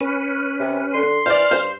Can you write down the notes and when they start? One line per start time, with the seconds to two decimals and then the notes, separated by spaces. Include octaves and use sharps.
0.01 C#4 B4
0.60 C3
0.94 D3 C6
1.26 E3 C5 D5 F6
1.51 G2 C5